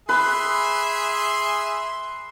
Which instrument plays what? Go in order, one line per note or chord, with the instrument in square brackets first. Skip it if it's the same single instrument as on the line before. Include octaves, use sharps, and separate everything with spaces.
[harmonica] G#4 E5 [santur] B4 [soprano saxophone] C6